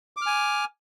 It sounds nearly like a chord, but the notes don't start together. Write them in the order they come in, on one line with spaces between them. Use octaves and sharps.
D6 F6 G#5